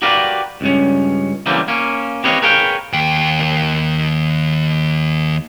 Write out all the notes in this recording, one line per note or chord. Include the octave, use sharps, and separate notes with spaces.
F#4 G4 A#4 B4 D5 F5
C#2 G2 C#4
C#3 E3 F#3 G3 A#3 C4
A#3 C#4
C4 G4 B4 C#5 D#5 F5
G#4 A#4 B4 C#5 F5 G5
D#2 G5